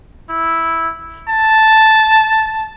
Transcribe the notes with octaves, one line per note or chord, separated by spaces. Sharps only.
E4
A5